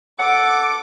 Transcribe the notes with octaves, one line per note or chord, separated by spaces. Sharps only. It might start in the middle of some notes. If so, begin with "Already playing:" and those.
A4 F#5 D6